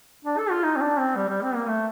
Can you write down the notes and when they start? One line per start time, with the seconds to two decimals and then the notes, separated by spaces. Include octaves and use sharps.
0.25 D4
0.38 A4
0.51 F4
0.64 D#4
0.76 C4
0.81 D4
0.98 C4
1.16 G3
1.29 G3
1.42 C4
1.55 A#3
1.68 A3